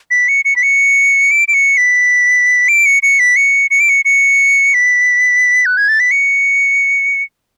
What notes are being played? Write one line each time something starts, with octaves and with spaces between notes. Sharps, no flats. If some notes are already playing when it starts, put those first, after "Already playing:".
B6
C#7
C#7
B6
C#7
D7
D7
C#7
B6
D7
C#7
C#7
B6
C#7
C#7
D7
C#7
C#7
B6
F#6
G#6
A6
B6
C#7